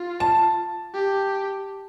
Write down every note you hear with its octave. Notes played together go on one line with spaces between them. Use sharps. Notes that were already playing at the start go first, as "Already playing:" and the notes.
Already playing: F4
A5
G4